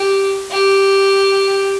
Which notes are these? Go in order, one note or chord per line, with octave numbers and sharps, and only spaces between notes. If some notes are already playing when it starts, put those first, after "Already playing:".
Already playing: G4
G4